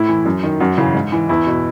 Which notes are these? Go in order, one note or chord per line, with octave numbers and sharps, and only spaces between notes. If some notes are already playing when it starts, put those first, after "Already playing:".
Already playing: A2 E4
E3
F#2
D#3
F#2 F#4
C#3 E3
G#2
E3
E2 E4
B2